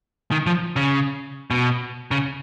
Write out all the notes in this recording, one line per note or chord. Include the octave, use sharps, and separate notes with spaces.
D#3
F3
C#3
B2
C#3